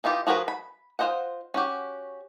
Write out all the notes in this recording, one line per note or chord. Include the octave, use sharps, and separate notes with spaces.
E3 D#4 F4 G4
F3 F#4 G#4 A#4 B4
B5
F4 G#4 C5 D#5 F#5
C#4 F#4 G4